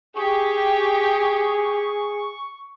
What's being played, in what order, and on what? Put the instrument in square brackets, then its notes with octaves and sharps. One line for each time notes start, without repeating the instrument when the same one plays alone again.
[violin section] G4 [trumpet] G#4 [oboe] C#6